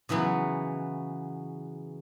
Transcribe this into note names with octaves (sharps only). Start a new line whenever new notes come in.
C#3 E3 F#3 B3